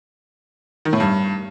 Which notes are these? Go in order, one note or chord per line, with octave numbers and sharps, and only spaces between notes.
D#3
A2
G2